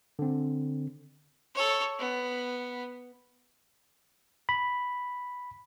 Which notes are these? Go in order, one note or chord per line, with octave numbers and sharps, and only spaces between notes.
D3 C4
A4 C#5
B3
B5